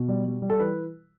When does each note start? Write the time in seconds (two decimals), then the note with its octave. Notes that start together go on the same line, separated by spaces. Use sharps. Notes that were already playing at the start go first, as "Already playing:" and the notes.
Already playing: B2
0.08 G3
0.25 G3
0.42 G3
0.50 A4
0.60 E3 B4